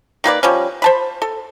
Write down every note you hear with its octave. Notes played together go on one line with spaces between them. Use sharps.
D#3 A#3 B4 D5
F3 G3 C#4
C5 A5 B5
A4